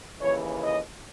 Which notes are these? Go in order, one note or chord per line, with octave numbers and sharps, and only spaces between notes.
D#2 C#3 E3 C#5
D#5